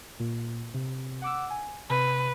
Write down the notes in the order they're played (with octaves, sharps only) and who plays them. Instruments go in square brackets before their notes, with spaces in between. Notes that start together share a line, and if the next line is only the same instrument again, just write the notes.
[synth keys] A#2
C3
F#5 D6 E6
G#5
[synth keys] C3 [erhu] B4